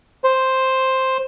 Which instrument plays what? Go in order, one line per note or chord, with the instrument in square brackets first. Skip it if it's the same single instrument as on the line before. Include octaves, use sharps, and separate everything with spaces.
[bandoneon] C5